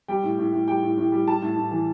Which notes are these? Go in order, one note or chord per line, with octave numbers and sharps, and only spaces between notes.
G3 G5
A2
A2
A2
G3 G5
A2
A2
G3
G3 A5
A2
A2
E3